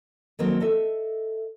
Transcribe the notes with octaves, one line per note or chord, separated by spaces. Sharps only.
D#3 F#3 A#3 C4
A4 D#5 E5